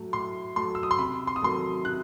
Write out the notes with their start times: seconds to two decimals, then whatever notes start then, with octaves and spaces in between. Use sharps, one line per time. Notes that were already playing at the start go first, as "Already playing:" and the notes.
Already playing: A2 F#3 A3
0.13 A2 C6
0.56 F#3 A3 C6
0.75 E6
0.83 D#6
0.91 C6
0.99 C3 B5
1.27 C6
1.36 D#6
1.42 D#3 F#3 A3 C6
1.85 C3 F#6